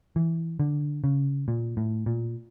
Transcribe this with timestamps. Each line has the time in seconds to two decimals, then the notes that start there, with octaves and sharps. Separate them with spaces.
0.16 E3
0.60 D3
1.04 C#3
1.48 A#2
1.77 A2
2.06 A#2